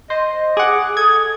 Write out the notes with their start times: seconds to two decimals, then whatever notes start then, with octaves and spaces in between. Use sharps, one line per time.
0.10 C5 D#5
0.57 G#4 F#5 D6
0.97 A4 D#6 G#6